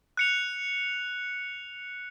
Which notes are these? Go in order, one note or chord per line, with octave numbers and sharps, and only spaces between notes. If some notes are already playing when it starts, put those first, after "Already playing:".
F#6 C#7 F7